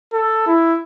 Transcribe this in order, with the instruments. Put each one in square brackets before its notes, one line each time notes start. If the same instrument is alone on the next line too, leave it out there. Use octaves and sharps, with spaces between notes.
[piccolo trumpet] A4
E4